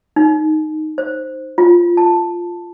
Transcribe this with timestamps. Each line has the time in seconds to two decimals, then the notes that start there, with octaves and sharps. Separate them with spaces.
0.16 D#4
0.98 C5
1.58 F4
1.97 A5